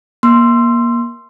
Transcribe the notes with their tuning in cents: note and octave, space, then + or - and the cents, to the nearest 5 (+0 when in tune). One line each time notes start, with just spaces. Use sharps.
A#3 +25 C6 +0 E6 +30